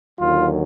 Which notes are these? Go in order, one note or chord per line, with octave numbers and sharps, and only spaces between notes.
D#2 D3 F#3 F4